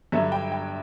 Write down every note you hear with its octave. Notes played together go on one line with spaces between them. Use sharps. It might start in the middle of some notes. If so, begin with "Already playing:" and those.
G2 D3 F#3 E5
G5
G5